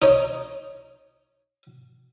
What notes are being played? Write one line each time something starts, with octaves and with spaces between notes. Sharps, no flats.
D#4 C#5